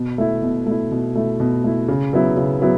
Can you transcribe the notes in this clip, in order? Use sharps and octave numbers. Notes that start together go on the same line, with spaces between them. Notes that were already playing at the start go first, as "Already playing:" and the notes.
Already playing: B2
A3 E4
B2
A3 E4
B2
A3 E4
B2
A3 E4
C#3
F#3 B3 E4
C#3
F#3 B3 E4